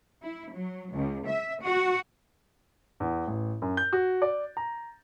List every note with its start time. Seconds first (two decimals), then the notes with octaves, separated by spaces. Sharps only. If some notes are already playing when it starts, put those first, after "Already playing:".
0.22 E4
0.53 F#3
0.93 C#2
1.27 E5
1.62 F#4
3.00 E2
3.27 A1
3.62 F#2
3.77 G6
3.93 F#4
4.22 D5
4.57 A#5